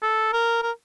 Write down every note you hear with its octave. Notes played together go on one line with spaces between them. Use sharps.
A4
A#4
A#4